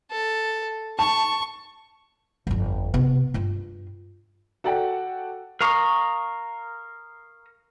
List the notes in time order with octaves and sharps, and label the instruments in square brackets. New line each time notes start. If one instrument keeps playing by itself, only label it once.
[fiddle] A4
[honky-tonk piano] A5 [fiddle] C#6
[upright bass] G1 F2
C3 B3
G2 F4
[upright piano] F#4 A4 D5 F#5 G5
[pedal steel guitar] A#4 F5 A#5 C#6 D#6